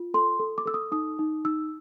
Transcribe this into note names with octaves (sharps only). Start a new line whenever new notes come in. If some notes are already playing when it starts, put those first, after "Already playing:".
Already playing: F4
A4 C6
A4
D6
A4 E6
D#6
D#4 D#6
D#4
D#4 E6